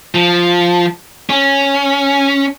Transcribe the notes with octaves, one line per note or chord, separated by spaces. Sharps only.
F3
C#4